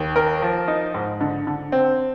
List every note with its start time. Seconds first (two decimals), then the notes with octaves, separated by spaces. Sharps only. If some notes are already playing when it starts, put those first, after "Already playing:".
Already playing: D#2
0.16 A#4
0.42 F3
0.68 D#4
0.94 G#2
1.21 D3
1.47 D3
1.72 C4